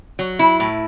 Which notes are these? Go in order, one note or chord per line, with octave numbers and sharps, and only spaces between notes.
F#3
E4
A2